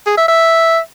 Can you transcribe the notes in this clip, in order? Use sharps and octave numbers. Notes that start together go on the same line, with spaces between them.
G#4
E5
E5